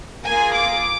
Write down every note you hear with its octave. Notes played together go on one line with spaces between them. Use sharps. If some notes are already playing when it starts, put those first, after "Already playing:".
A#3 F4 G#4 G#5
D6